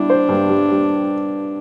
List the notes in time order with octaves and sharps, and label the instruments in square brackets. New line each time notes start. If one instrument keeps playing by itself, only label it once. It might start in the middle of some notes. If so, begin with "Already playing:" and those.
Already playing: [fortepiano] G3 E4 [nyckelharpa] D4
[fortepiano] C5
G2
G3
G3